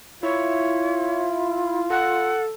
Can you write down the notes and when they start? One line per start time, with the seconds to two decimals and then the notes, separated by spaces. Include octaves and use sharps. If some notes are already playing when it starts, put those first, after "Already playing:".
0.23 E4 F4 C#5
1.90 A4 F#5